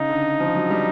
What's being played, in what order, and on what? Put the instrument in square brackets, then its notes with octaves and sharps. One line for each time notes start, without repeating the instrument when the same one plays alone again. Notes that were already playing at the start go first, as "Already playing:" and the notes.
Already playing: [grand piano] C#3 [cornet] D#4
[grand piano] D3
F3
F#3
G3